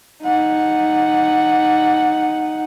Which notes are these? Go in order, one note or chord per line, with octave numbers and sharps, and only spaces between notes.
D#4 F#5